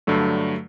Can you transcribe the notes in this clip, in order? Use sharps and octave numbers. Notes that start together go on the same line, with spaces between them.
G2 D3 F#3 A3